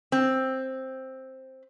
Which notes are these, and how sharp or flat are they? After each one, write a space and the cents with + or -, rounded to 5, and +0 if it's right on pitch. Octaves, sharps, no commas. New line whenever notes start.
C4 +5